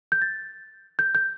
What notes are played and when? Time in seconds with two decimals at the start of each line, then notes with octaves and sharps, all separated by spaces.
0.12 G6
0.22 A6
0.99 G6
1.15 G6